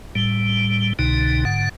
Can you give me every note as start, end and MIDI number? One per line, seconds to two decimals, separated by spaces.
0.15 0.93 45
0.15 0.93 55
0.99 1.45 36
0.99 1.45 47
0.99 1.45 50
0.99 1.45 63
1.45 1.69 44
1.45 1.69 50
1.45 1.69 78